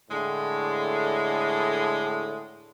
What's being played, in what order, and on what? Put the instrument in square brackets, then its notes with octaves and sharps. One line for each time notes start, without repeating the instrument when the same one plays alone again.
[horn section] A2 D3 G#3